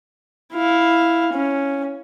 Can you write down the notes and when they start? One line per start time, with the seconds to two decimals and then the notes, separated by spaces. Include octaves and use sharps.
0.53 E4 F5
1.33 C#4